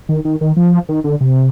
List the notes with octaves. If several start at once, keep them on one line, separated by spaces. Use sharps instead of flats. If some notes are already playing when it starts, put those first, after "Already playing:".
D#3
D#3
D#3
F3
D#3
D3
C3